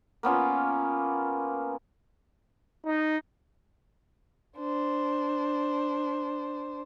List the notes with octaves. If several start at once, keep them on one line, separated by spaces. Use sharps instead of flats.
A#3 B3 C#4 F4
D#4
D4 C5